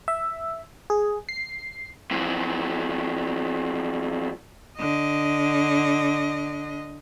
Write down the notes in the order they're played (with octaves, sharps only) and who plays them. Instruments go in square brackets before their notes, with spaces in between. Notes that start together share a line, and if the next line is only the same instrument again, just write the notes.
[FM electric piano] E5
G#4
C7
[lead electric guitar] F2 E3
[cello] D3 D#5